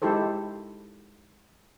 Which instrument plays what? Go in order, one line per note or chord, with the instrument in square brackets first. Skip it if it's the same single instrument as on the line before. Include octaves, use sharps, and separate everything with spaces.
[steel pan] G#3 D#4 E4 G4 A4 C5